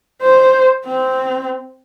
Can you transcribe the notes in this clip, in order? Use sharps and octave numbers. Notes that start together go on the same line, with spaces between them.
C5
C4